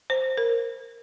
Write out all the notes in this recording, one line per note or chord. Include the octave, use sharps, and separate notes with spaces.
C5
A#4